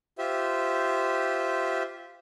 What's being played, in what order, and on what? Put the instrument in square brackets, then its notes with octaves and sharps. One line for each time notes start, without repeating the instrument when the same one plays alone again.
[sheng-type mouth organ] F4 G4 C5 E5